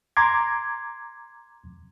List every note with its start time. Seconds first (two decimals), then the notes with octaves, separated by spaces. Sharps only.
0.17 A#5 C6 D6 G#6